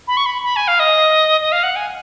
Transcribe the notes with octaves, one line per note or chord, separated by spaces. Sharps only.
B5
C#6
B5
B5
G#5
F5
D#5
D#5
F5
F#5
G#5